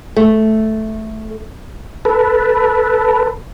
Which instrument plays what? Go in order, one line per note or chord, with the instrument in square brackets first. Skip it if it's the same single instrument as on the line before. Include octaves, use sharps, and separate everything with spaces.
[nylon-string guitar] A3
[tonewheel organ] A4 B4